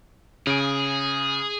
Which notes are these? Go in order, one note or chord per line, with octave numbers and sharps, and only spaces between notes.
C#3 G#4 D7